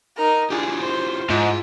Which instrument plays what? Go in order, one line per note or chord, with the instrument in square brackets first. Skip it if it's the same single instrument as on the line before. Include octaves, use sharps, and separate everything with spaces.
[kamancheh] D#4 A#4
[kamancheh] D4 G#4 [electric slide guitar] E4 F4 G4
[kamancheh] C5
[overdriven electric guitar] G#2 [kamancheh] E4 [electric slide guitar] F4